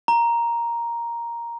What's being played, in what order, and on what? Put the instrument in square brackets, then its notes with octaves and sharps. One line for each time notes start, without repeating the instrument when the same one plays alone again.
[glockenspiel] A#5